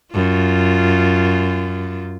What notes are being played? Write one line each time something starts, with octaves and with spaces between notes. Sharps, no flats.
F#2 F4